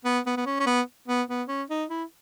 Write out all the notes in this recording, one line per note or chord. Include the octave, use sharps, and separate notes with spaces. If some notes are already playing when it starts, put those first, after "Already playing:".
B3
B3
B3
C#4
C#4
B3
B3
B3
C#4
D#4
E4